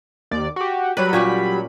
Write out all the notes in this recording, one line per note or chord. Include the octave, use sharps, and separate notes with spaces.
D#2 D5
F#4 G4
F#3 G3 B4 B5
A#2 C#4 G4